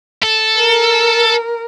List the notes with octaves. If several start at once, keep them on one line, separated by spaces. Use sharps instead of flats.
A4
A#4